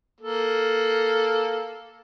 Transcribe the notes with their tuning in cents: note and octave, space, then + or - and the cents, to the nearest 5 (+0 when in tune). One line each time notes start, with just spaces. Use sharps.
A#3 +0 A4 +0